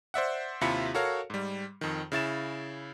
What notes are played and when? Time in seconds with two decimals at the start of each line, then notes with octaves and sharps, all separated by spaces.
0.14 C5 D5 E5 F#5
0.61 D#2 C3 E4 F4 B5 C#7
0.94 F#4 A4 A#4 C#5 F5
1.30 G#2 G3
1.81 F2 D#3
2.12 C#3 E4 A6 E7